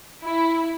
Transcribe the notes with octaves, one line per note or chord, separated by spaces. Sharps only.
E4